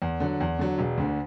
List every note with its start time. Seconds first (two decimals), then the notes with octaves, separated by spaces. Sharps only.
0.02 E2
0.20 D3 F#3
0.41 E2
0.59 D3 F#3
0.78 E1
0.98 D2 D3